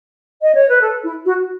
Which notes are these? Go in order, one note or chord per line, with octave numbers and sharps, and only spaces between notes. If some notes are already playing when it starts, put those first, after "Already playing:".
D#5
C#5
B4
A4
E4
F#4